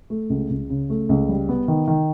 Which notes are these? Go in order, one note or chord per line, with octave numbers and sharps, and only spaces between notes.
A3
C#2
C#2
C#3
A3
C#2
G3
B3
D#3
D#3